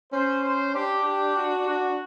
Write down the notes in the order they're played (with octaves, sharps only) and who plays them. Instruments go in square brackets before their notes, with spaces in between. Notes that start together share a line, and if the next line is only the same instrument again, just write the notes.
[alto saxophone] C#4 [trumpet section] C5
[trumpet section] C5
[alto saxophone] D4 [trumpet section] G4
[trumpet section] G4
F#4
F#4